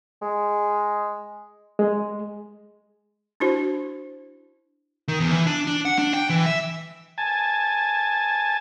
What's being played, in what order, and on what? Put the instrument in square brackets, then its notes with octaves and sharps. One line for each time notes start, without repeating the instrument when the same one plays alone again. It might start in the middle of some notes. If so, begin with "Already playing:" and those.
[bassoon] G#3
[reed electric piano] G#3
[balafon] D4 E4 F#4 C5
[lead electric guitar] D#3
E2
E3
D4
D4
F#5
D4
G5
E3
E5
[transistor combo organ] G#5 A5